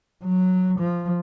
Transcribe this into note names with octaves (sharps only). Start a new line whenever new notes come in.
F#3
F3